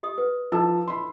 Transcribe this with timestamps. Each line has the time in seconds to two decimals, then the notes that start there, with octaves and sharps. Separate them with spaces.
0.03 G4 D#5 D#6
0.18 B4
0.52 F3 D#4 E4 A4 A5 E6
0.88 B5 C6